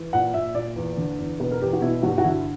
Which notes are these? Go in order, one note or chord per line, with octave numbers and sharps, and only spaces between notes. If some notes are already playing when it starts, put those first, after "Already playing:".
Already playing: E3
A#2 F#5
A#2 E5
A#2 D5
E2
D3
E2
B2 B4
A#4
E2 G4
F#4
B2 E4
G2 F#4
F#4
D3 E4